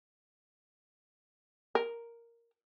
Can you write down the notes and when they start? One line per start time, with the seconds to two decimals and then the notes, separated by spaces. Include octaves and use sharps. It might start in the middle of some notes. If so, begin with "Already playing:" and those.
1.75 A#4